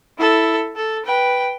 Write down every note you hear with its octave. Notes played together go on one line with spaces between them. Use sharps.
E4 A4
A4
B4 G5